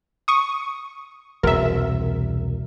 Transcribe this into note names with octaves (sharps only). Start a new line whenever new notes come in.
C#6 D#6
E1 C2 A#4 E5